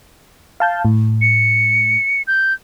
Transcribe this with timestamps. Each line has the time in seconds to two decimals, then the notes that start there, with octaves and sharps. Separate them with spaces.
0.60 F5 A5 G6
0.85 A2
1.21 C#7
2.27 G6